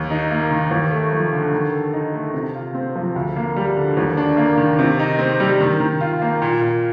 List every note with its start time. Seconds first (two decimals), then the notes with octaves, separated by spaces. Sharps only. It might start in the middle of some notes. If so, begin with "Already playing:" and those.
Already playing: D#2
0.10 D#4
0.31 A#3
0.51 D#3
0.71 D#2
0.91 A3
1.12 F3
1.32 D3
1.52 D#3
1.72 A4
1.93 D#4
2.14 A3
2.34 C3
2.55 F4
2.74 C4
2.96 F3
3.16 D2
3.36 A#3
3.56 G3
3.76 D3
3.97 D#2
4.17 D4
4.37 A#3
4.58 D#3
4.79 C3
4.99 D#4
5.19 C4
5.40 G3
5.61 D#3
5.80 D#3
6.01 F4
6.22 A#3
6.42 A#2
6.61 A#2